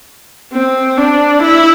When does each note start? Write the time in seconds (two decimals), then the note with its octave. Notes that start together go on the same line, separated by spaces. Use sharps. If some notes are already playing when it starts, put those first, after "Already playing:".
0.53 C4
0.98 D4
1.43 E4